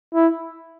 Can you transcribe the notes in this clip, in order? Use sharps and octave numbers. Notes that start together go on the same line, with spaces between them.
E4